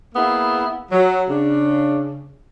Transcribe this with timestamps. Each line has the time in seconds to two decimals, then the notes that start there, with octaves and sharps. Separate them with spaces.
0.15 A#3 B3 E4 G#4
0.92 F#3
1.29 C#3 D4